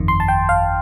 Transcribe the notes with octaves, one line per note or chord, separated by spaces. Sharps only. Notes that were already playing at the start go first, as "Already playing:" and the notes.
Already playing: G1 F2 D#3
C6
A5
G5
F5